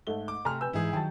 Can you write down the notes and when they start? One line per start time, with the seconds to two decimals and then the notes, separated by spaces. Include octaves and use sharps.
0.07 G#2 A3 G7
0.28 D6
0.45 C3 A3 G#5 A#5 C6 F6
0.61 B4 G#5 E6 G6
0.73 G#2 E3 D#4 E4 G#4
0.93 D#3 F#3 G5 A5 A6